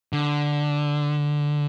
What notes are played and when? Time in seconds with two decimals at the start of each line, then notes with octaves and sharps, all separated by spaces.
0.13 D3